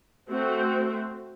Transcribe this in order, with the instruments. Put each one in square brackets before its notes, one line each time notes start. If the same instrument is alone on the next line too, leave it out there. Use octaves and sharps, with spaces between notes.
[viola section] A3 C4 F#4 C5